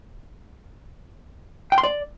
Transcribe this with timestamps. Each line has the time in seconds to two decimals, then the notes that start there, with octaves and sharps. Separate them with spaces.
1.72 G5
1.78 C6
1.83 D5